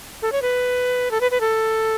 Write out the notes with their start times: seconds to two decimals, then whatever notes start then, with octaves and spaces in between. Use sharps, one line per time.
0.22 A4
0.32 C#5
0.42 B4
1.11 A4
1.21 B4
1.31 B4
1.41 A4